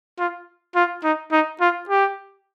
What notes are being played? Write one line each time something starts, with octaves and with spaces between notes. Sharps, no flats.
F4
F4
D#4
D#4
F4
G4